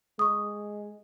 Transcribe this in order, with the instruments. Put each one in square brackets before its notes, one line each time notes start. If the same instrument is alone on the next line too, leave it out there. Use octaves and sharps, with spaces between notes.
[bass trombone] G#3 [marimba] C#6 D#6